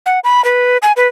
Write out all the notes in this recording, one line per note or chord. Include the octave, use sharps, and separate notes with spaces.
F#5
B5
B4
G#5
B4